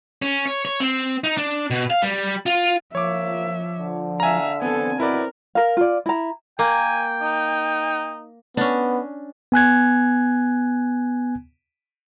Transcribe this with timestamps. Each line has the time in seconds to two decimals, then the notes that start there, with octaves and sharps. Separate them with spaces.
0.22 C#4
0.46 C#5
0.65 C#5
0.80 C4
1.24 D#4
1.37 D4
1.71 B2
1.90 F5
2.02 G3
2.46 F4
2.95 F3 A#3 C#5 E5 D6
3.78 D3
4.20 E5 F5 G#5 A#5
4.62 B3 C4 A4 G#5
5.00 B2 E4 A#4 B4 D5
5.55 A#4 F5
5.77 F4 D5
6.06 E4 A#5
6.59 A#3 G5 G#5
7.22 D#4
8.57 B3 C#4 D4
9.52 B3 G#5 F#6 G#6